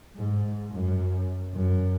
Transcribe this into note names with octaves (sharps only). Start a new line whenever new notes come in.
G#2
F#2
F#2